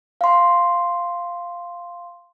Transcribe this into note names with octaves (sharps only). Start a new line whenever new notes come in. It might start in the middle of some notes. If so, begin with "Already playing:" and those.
F5 C6